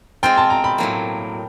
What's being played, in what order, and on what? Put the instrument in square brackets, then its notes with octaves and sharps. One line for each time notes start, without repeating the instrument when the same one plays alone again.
[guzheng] G#3 C4 F4 [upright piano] G5
[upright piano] A5
A#5
B5
[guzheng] A2 F#3 A#3